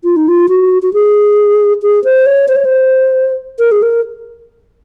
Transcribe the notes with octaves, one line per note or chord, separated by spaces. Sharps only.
F4
D#4
F4
F#4
F#4
G#4
G#4
C5
C#5
C5
C#5
C5
A#4
G#4
A#4